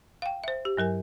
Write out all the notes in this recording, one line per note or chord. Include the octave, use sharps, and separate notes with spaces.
F5 G5
C5 E5
G4
G2 F#3 A#4 G#5